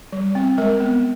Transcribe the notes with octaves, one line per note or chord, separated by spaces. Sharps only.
G3
C4
G#3 A#4
B3